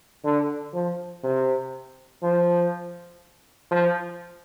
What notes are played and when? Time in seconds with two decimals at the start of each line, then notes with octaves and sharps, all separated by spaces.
0.24 D3
0.74 F3
1.24 C3
2.23 F3
3.71 F3